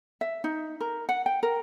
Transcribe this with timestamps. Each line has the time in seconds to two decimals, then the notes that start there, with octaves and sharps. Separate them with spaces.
0.21 E5
0.44 D#4
0.81 A#4
1.09 F#5
1.26 G5
1.43 A#4